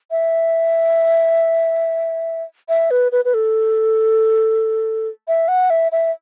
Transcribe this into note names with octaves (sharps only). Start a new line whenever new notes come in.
E5
E5
B4
B4
B4
A4
E5
F#5
E5
E5